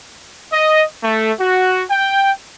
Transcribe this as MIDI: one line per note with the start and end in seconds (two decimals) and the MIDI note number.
0.52 0.84 75
1.02 1.31 57
1.40 1.83 66
1.90 2.31 79